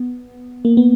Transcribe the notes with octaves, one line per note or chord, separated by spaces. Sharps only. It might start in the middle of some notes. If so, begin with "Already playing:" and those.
Already playing: B3
A#3
B3